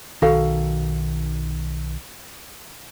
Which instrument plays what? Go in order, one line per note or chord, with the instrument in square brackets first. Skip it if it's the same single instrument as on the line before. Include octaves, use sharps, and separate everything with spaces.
[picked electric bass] B1 D#3 [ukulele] F#4 A4 F5